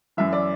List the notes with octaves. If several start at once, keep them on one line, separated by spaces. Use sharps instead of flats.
F#2 E3 E5
D5